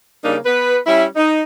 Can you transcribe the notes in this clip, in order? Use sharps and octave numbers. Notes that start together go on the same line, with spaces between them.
C#3 G3 A#3 D4 D#4
B3 B4
G3 C#4 E4
D#4